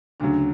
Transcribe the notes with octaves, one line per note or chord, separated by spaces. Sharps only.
D2 C#3 F#3 D4